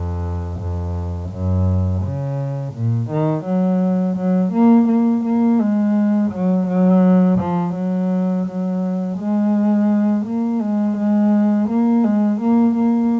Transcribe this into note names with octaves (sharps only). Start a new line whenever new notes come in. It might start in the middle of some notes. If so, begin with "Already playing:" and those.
Already playing: F2
F2
F#2
C#3
A#2
D#3
F#3
F#3
A#3
A#3
A#3
G#3
F#3
F#3
F3
F#3
F#3
G#3
A#3
G#3
G#3
A#3
G#3
A#3
A#3